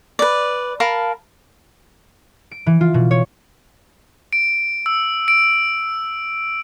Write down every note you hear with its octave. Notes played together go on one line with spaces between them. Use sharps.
B4 D5
A#4 F5 A5 B5
D7
E3
F4
B2
C#5
D7
E6
D7